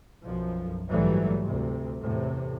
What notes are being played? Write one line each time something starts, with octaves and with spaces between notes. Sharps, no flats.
B1 F#2 F3
A#1 G#2 E3 F#3 G3 A3
D2 C3
E2 A2 C3